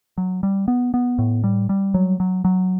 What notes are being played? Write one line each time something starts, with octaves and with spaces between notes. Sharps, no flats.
F#3
G3
B3
B3
A2
G3
G3
F#3
F#3
F#3